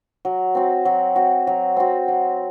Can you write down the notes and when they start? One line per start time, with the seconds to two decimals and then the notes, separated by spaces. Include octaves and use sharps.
0.25 F#3
0.55 C4 F#4
0.85 F#3
1.16 C4 F#4
1.47 F#3
1.77 C4 F#4
2.08 F#3